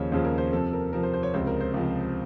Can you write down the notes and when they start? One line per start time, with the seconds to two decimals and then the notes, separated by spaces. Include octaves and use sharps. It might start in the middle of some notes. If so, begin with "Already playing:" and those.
Already playing: D#2 C#3 F3 C#5
0.12 D#2 C#3 F3 C5
0.24 A#4
0.38 C5
0.52 F2 C3 F3 A4
0.73 A#4
0.93 F2 C3 F3 A#4
1.03 C5
1.13 C5
1.23 C#5
1.34 C#2 C3 F3 C5
1.47 A#4
1.61 C5
1.74 C#2 C3 F3